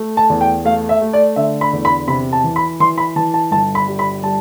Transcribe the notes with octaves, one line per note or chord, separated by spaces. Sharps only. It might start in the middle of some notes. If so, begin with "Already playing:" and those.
Already playing: A3
A5
E2
G5
A3 F5
E5
A3
D5
D3 E5
B5
E2
B5
C3 B5
A5
E3
B5
E3 C6
B5
E3 A5
A5
G1 A5
B5
G3
B5
G3 A5